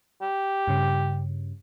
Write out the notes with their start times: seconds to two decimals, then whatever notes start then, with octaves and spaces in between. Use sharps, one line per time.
0.22 G4
0.68 G2 C#3